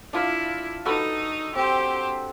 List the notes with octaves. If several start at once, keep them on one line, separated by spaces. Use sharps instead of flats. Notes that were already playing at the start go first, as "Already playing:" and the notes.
D4 E4 F4 F5
D#4 F#4 A4 B4
C4 G4 C5